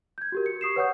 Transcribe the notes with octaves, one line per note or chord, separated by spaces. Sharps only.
G6 G#6
F#4 G4 A#4
C#7
C#6 D#6 C7 E7
B4 C#5 F#5 C#6 D#6 G6